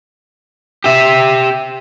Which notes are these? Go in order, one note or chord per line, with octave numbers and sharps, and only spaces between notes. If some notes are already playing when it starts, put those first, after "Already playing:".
G4 E5